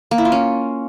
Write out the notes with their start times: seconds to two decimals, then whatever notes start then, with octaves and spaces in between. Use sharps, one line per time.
0.11 A#3
0.18 E4
0.25 F4
0.32 C#4